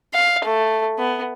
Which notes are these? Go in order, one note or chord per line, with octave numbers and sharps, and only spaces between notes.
F5
A3
B3